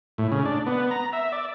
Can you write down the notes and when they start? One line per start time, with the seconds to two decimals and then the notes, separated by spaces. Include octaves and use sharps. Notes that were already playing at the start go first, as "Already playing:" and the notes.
0.18 A2
0.32 C#3
0.45 D4
0.66 B3
0.91 A#5
1.13 E5
1.32 D5